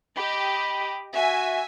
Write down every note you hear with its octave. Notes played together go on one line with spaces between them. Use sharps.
G4 D#5 B5
F#4 E5 G#5